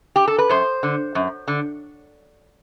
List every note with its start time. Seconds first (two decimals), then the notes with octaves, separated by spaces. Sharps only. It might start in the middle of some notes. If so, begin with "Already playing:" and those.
0.16 G4
0.27 A4
0.38 B4
0.49 F#2 C5
0.83 D3
1.15 F#2
1.48 D3